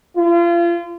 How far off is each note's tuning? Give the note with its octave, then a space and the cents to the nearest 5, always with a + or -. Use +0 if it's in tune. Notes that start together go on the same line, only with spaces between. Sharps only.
F4 -35